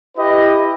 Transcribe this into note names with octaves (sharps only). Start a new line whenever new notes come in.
E4 G4 B4 D#5